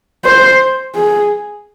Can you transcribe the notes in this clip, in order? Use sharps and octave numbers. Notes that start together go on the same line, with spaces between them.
C5
G#4